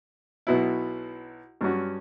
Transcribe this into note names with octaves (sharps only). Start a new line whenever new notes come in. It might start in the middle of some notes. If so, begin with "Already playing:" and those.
B1 B2 F#3 B3 E4
G2 F#3 C#4 F#4